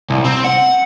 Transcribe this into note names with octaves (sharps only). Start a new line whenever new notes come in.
C2
C4
F#5